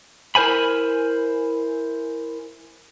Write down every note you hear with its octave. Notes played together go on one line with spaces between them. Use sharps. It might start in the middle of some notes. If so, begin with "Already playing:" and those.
E4 A#4 C5 G#5 B5